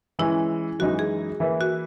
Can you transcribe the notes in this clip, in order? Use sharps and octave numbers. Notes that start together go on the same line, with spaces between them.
E3 G#3 C#4 E4
F#2 E3 G#3 D#4 F#4
G#4
E3 A#3 E4 B4
F#4